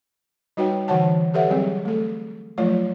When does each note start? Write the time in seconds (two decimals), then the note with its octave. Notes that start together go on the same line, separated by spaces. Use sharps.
0.57 G3 D#4 F#4 B4 C#5 G5
0.88 D3 E3 F#4 C#5 F#5 A5
1.34 G4 A4 B4 C#5 E5 F#5
1.48 F#3 G3 C4 G#4
1.85 A3 A4
2.58 F3 F#3 A3 F4 C#5